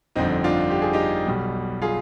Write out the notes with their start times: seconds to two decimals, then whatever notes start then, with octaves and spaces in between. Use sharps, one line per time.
0.16 G1 F2 D3 C4 D#4
0.44 D4 F4
0.71 G4
0.82 G#4
0.93 D#4 G4
1.26 B1 B2 G3
1.82 F4 G#4